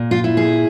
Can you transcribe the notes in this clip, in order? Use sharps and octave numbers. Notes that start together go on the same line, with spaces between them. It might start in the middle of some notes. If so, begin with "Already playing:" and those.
Already playing: A#2
F4
E4
G#4